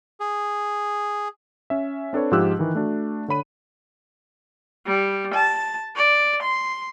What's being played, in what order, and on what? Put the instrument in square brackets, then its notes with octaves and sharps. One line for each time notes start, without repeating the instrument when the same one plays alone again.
[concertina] G#4
[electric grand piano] C#4 E5
C4 D4 A4 B4 C#5
G#2 F3 F4 G4 E6 F#6
D#3 E3
A3 D4 F#4
D3 C#5 B5 D#7
[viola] G3
A5
D5
C6